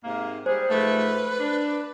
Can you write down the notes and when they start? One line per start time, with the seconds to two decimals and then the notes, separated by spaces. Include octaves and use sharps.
0.04 G#2 C3 A#3
0.46 G3 G#4 C5
0.69 G#2 F3 A3 B4
1.40 D4